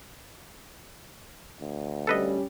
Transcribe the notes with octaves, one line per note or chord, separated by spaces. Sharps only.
D2
G3 C#4 A4 B4 D#5